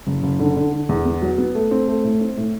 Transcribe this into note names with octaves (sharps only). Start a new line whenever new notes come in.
F#1
F#1
D3
D3
D3
E2
B3
F#3
B3
A3
C4
A3
A2
C4
A2